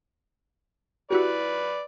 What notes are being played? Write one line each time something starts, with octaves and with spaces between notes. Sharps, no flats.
E4 F#4 G4 B4 D5